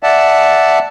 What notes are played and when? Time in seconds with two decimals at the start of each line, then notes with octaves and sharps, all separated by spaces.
0.03 D5 E5 F#5 A5